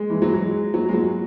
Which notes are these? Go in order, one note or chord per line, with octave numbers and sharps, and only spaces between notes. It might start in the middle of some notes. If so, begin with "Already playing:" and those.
Already playing: G#3
E3
F#3
G#3
F#3
G#3
F#3